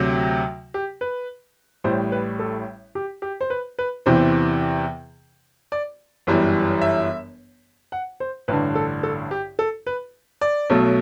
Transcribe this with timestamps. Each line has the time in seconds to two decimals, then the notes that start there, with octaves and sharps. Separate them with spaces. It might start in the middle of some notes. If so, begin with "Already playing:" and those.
Already playing: D2 C3 F#3
0.74 G4
1.01 B4
1.84 A1 A2 G3 C5
2.12 B4
2.39 A4
2.95 G4
3.22 G4
3.41 C5
3.50 B4
3.79 B4
4.06 E2 C3 E3 C5
5.72 D5
6.27 G1 F#2 E3 G3
6.82 E5
7.92 F#5
8.20 C5
8.48 A1 G2 D3 B4
8.75 A4
9.03 A4
9.31 G4
9.59 A4
9.87 B4
10.41 D5
10.70 B1 B2 F#3 A3